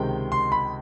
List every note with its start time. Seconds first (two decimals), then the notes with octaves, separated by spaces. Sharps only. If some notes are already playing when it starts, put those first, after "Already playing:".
Already playing: C#2 C3 D#3 G#3 G5
0.32 C6
0.52 B5